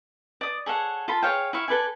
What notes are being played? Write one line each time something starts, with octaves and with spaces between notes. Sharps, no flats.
D5 D#6
G#4 A4 C#5 F#5
F4 A4 B5
G#4 C#5 F5 G5
E4 E5 F5 C#6
A4 B4 D5 G#5